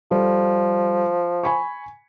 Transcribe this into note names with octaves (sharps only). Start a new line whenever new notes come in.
F3 G3 A4
G#5 B5 C#6